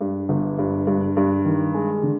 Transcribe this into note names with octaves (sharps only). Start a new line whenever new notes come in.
G2
G1
G2
G2
G2
D#3
G#3
D3